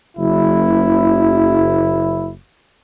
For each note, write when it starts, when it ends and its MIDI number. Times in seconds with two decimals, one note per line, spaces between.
0.17 2.31 30
0.17 2.31 64